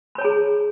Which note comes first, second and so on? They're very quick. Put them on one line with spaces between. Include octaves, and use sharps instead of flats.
B5 C#5 A#5 G#4